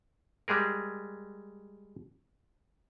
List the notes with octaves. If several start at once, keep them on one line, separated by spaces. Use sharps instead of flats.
G3 G#3 G#4 A#4